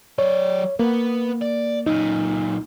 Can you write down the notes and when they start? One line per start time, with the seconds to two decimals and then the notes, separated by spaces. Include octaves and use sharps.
0.19 F#3 C#5 D5
0.79 A#3 B4 F#5
1.41 D5
1.86 F#2 A#2 D#4